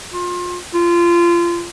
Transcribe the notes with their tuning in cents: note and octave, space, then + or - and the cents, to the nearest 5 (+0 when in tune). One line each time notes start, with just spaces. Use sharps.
F4 +30
F4 -25